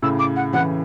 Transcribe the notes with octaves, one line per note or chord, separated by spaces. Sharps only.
A2 C#3 E6
D6
F#5
C#3 E3 F#5